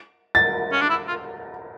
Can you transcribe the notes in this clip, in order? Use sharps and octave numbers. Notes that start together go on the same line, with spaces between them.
A6
C#4
D4
E4
F4